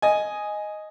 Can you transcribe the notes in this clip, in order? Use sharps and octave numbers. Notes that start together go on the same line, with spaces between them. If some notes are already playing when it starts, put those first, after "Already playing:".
D#5 G#5